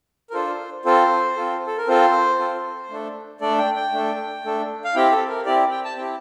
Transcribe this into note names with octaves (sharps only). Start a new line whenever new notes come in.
A#4
D4 F4 A4 C5
C4 F4 A4 C5
C4 F4 A4
A4
A#4
C4 F4 A4 C5
C4 F4 A4
A3 D4 A4
A3 D4 A4 D5
G5
G5
A3 D4 A4
A3 D4 A4
F5
C4 E4 G4 G5
A4
A#4
C4 E4 G4 D5
G5
A5
C4 E4 G4 G5